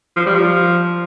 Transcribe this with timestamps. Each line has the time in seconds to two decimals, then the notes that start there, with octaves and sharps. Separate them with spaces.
0.17 F3
0.26 G3
0.35 F3